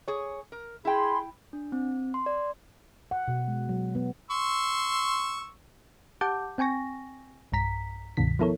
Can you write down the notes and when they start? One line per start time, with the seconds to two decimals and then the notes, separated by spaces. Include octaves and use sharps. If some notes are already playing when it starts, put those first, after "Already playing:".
0.08 G#4 C#5
0.52 A#4
0.85 E4 G#4 G5 B5 C6
1.53 D4
1.72 C4
2.14 C6
2.26 D5
3.11 F#5
3.28 B2
3.48 G#3
3.69 F#3
3.95 B3
4.31 C6 C#6 E6
6.21 G4 F#5 A5 D6 G6
6.58 C4 G5 G#5 C#6 A#6
7.52 B1 G2 A#5 B6
8.17 C#2 G2 B2 D#3 B6
8.39 F3 B3 E4 A4 A#4 C#5